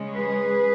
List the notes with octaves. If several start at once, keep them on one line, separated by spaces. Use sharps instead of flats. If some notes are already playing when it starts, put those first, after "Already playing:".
Already playing: C#3 G#3 C#4
G#4 B4